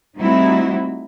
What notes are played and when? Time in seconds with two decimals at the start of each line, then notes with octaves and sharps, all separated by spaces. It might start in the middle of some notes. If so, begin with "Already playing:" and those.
0.17 G3 A3 C4 D#4 E4 F#4